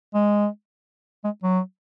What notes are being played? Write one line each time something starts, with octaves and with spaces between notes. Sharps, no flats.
G#3
G#3
F#3